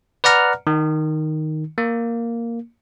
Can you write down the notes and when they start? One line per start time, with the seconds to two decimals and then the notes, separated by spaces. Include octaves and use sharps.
0.24 B4 D5 F#5 A#5 F6
0.67 D#3
1.78 A#3